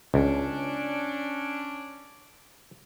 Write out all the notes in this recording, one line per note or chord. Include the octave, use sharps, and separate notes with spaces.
C#2 C#4 D4